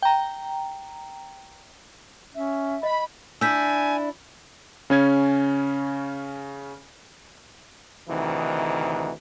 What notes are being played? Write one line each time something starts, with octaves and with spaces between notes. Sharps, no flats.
G5 A#5
C#4 E5
D#5 B5
D4 E4 G#5 E6 G6 B6
C#3 C#4 G#6
D2 C3 D#3 E3 D#4